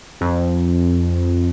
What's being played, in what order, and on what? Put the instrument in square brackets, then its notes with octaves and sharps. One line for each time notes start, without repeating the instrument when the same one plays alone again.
[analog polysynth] F2